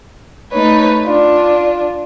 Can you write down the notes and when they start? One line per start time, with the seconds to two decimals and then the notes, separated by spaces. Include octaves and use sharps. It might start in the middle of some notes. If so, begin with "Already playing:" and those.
0.52 A3 D#4 B4 C#5
1.06 D4 F4